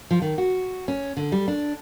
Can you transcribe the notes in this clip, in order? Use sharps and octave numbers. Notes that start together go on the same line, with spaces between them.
F3
D#3
F#4
C#4
D3
G3
D4